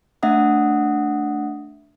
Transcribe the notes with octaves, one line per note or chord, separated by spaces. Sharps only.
A3 D4 E5 F#5 D#6